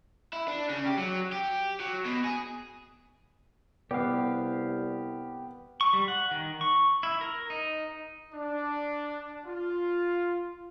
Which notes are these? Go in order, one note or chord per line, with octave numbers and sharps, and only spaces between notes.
E4
D4
C#3
G4
F#3
G4
F#3
B2
G#4
C2 B3 G4 F5
C#6
G3
F#5
D#3
C#6
E4
A#4
D#4
D4
F4